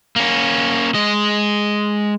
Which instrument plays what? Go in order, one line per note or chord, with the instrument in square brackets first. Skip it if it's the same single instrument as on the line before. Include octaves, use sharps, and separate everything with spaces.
[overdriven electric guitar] A#3 C#4
G#3 D#5